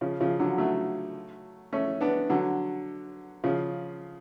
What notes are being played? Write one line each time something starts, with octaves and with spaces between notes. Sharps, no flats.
C#3 F3
C#3 F3
D3 F#3
F#3 A3
A3 C#4
B3 D4
D3 F#3
C#3 F3